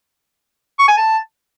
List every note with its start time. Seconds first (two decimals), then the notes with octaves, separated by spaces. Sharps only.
0.79 C#6
0.88 G#5
0.97 A5